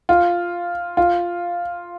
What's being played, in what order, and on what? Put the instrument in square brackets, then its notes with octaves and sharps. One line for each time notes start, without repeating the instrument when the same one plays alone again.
[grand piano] F4
F4